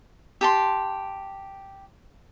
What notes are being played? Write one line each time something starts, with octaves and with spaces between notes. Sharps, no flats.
G4 A5 C6